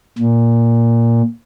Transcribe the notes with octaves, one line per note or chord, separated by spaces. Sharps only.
A#2